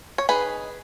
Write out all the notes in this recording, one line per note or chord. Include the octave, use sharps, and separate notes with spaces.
C#5
D#4 G#4 B4